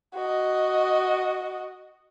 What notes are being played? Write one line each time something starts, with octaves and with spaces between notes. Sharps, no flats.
F#4 D#5